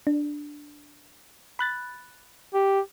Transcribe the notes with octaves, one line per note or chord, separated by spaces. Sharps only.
D4
B5 F#6 A6
G4